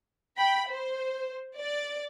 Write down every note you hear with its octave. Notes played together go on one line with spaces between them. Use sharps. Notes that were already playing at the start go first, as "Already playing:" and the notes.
G5 B5
C5
D5